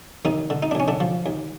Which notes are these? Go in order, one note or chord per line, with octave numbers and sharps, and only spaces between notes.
D#2 D#3 D#4
D3
D#4
D4
D#2 C#4
D3 D4
F3
D#2